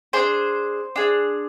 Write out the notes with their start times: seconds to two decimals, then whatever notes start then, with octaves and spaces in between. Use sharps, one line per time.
0.13 D4 G#4 C5
0.96 D4 G#4